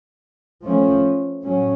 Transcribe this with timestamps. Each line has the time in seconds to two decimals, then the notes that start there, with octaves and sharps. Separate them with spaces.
0.63 F3 A3 C#4
1.43 A2 F#3 C#4